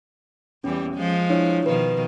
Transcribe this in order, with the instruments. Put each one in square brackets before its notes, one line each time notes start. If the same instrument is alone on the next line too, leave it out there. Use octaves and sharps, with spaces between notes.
[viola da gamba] E2 E3 G3 [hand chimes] C#4
[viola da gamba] F3 G#3
[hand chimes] D4 E4 C#5
[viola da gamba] B2 D#3 F3 [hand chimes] B4